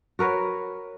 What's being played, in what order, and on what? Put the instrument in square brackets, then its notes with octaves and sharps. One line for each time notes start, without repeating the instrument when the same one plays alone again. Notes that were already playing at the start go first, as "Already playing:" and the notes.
[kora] F#4 A#4 B4 C#5